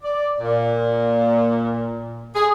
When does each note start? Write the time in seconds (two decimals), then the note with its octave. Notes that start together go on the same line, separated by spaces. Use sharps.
0.02 D5
0.40 A#2
2.34 G#4